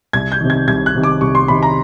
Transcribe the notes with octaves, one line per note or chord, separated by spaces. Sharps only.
C2 G#6
G6
C3 D#3
G#6
C2 G#6
F#6
C3 D#3
D6
C2 C#6
C6
C3 D#3 B5
A#5